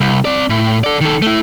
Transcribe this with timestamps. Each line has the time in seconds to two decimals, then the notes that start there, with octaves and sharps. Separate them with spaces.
0.01 C2
0.25 C4 D5
0.50 A2
0.84 A4 D5
1.01 D#3 A4
1.22 A3 E4